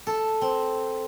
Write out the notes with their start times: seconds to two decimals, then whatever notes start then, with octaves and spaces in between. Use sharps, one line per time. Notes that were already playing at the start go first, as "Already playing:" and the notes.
0.07 A4
0.41 C4